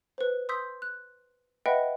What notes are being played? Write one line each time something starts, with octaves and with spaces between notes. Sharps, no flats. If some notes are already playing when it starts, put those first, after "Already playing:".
B4 C5
C6 D#6 E6 G6 B6
F#6
B4 D#5 E5 F#5 G5 B5